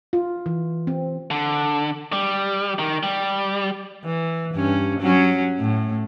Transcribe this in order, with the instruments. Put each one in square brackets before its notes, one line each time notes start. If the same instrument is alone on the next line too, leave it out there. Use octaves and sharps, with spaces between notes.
[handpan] F4
E3
C4
[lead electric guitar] D3
G3
D#3
G3
[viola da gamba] E3
G2 C#4
F#3 C#4
A2